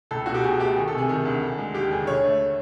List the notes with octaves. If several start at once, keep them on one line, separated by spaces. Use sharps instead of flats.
C#2 A4
B2 F#4
G4
B2 G#4
A3 G4
D#3 G#4
A4
C3
G#4
D#3 G#4
D2
D3
G#3
D#2 G4
D3 G#4
D3 C#5
A3